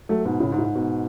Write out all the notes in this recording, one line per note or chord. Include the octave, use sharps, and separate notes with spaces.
F#3 A3
G#2 B2
A2 C#3
G#2
A2
G#2
G#2 B2